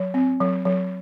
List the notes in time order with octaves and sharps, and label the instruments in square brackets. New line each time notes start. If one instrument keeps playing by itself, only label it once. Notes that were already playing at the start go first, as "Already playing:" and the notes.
Already playing: [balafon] F#3
C4
F#3
F#3